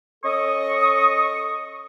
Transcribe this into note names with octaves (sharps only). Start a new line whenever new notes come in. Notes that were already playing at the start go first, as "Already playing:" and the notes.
C#4 A4 D#5 C#6 D#6